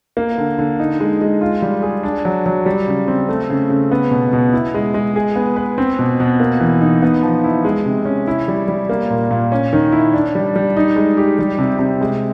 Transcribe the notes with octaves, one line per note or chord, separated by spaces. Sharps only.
A#3
D3
D3
D#4
G#3
G#3
F4
G3
G#4
D4
F#3
F#3
G3
C#3
C4
A3
C#3
C#3
B3
B2
B2
E4
G#3
G#3
G#4
B3
B4
C4
B2
B2
A#3
E3
D#4
B3
F3
E4
G#3
C3
C#4
E4
G3
G3
A#3
A#2
A#2
C#4
D#3
E4
D4
G3
G3
D#4
G#3
G4
G3
C3
C3
G#3